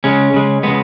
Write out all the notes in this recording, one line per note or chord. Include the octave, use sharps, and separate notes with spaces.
C#3 G#3 C#4
C#3 G#3
C#3 G#3 B3